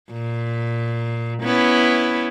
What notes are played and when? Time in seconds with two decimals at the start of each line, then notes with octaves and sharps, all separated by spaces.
0.11 A#2
1.43 B3 C#4 E4